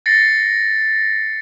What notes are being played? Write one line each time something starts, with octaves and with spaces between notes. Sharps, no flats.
A6 A#6 C7 C#7